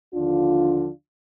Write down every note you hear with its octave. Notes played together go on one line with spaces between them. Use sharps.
D#2 D3 F3 D4 F4